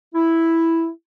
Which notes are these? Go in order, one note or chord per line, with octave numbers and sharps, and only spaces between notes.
E4